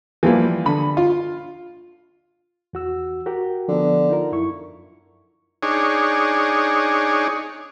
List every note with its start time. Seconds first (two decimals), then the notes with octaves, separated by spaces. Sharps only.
0.23 E3 F3 G3 A#3
0.66 D3 B5
0.97 F4
2.73 E2 F#4 E6
3.26 F#4 G4 A#4
3.68 D3 F3 B3
4.09 D#4 F4 A#4
4.32 F#2 E4 C#6
5.63 D4 D#4 G#4 C#5